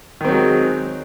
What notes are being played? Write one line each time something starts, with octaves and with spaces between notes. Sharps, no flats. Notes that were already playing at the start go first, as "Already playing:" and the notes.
D#3 F#3 G#3 C4